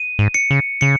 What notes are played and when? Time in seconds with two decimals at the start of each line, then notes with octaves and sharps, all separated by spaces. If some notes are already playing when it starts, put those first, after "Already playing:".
Already playing: D#7
0.19 G#2
0.34 C#7
0.51 C#3
0.81 C#3 C#7